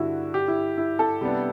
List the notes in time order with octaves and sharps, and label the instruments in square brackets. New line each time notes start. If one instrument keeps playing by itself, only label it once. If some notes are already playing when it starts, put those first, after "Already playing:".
Already playing: [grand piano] G2 D3 G3 [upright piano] E4 F#4
[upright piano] G4
E4
E4
A4
[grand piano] C3 G3 B3 D4